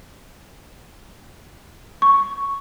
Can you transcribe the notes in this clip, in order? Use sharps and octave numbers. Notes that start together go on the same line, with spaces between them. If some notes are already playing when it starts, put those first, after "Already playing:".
C#6